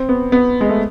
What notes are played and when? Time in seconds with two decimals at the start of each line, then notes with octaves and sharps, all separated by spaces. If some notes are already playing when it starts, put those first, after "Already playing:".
Already playing: C4
0.09 B3
0.32 B3
0.61 G#3
0.69 A3